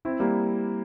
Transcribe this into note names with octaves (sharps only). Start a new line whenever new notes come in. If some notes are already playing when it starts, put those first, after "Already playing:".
C4 E4
G3 A#3